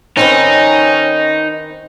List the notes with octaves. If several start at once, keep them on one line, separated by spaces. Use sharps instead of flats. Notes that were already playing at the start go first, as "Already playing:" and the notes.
D#3 C4 C#4 D#4 B4